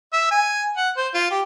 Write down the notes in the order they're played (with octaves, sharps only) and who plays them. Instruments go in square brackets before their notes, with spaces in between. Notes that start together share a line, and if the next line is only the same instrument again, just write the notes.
[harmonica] E5
G#5
F#5
C5
F4
G4